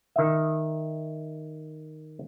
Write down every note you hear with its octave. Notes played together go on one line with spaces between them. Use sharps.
D#3 E5